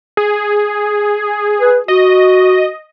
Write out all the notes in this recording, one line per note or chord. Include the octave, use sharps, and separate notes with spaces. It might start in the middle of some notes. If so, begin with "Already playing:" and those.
G#4
B4
F#4 D#5